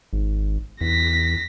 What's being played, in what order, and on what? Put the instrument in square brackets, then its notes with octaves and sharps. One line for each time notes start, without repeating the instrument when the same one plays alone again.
[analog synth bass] G#1
[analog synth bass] E2 [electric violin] A#6 B6